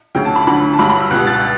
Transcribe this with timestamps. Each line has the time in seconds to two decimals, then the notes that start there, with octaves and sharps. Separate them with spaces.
0.15 D2 C#3 F#3 G5
0.25 A5
0.36 B5
0.47 D2 D3 F#3 B5
0.73 A5
0.79 G2 F#3 B5
0.90 B5
1.00 E6
1.11 C#2 B2 G3 F#6
1.27 A6